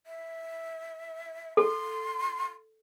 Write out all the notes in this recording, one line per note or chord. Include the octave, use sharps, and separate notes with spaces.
E5
A4 C6